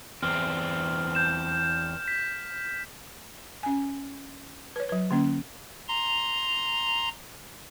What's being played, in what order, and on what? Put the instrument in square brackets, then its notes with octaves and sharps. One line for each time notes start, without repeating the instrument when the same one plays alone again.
[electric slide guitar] E2 C4 [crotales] F6
[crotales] G6 E7
B6
[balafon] C#4 G#5
B4 C#5
F#3 B4
D3 A#3 C#4
[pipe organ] A#5 C6